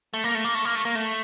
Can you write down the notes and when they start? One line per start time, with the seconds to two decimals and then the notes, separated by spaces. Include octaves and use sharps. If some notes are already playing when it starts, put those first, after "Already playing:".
0.14 A3
0.24 A#3
0.35 A3
0.45 A#3
0.55 A3
0.65 A#3
0.75 A3
0.85 A#3
0.95 A3